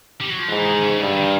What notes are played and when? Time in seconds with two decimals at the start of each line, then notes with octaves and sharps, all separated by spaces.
0.21 G3
0.30 F#3
0.39 F3
0.49 G#2 E3
0.65 D#3
0.82 C#3
0.99 G2 D3
1.16 D#3